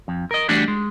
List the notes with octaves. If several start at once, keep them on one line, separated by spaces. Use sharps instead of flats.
F2
A#4 D#5
E3 G3 A3 D4 F#4
G#3